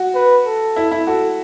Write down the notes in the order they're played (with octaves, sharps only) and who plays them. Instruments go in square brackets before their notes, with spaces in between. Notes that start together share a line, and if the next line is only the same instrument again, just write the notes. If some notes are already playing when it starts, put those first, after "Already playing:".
Already playing: [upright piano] F#4
[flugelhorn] B4
A4
[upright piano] E4
E4
[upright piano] F#4 [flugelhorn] A4